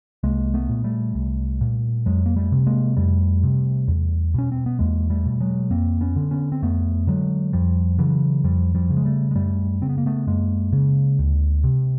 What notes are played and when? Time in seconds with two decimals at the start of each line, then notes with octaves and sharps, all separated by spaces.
0.23 C2 G#3 A#3
0.54 A3 B3
0.69 A#2
0.84 G3 A3
1.15 C2
1.61 A#2
2.06 F2 F#3 G#3
2.26 A#3
2.36 G3 A3
2.52 C3
2.66 G#3 A#3
2.97 F2 G3 A3
3.43 C3
3.88 E2
4.34 B2 C#4
4.52 C4
4.66 B3
4.79 E2 G#3 A#3
5.10 G3 A3
5.26 B2
5.40 F#3 G#3
5.70 F2 A#3 C4
6.01 B3 C#4
6.16 D3
6.31 B3 C#4
6.52 C4
6.62 F2 A3 B3
7.07 D3 F#3 G#3
7.53 F2 F3 G3
7.98 C#3 E3 F#3
8.44 F2 F3 G3
8.75 F3 G3
8.90 C#3
8.97 G#3
9.05 G3 A3
9.31 G#3
9.35 F#2 G3 A3
9.81 C#3 C4
9.89 B3
9.98 A#3
10.06 A3 B3
10.27 F#2 G#3 A#3
10.73 C#3
11.19 D2
11.64 C3